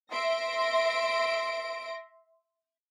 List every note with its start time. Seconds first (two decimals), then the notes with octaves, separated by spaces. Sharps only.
0.12 E5 C6 A#6 D7